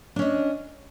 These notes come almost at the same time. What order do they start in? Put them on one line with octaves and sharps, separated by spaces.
D4 C#4 D#5